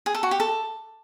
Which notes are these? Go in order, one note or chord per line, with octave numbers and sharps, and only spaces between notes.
G#4
A4
F#4
G4
A4